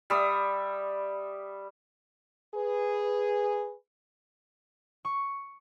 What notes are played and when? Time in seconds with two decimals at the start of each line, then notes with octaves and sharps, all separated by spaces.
0.10 G3 E5 D#6
2.54 G#4 B4
5.05 C#6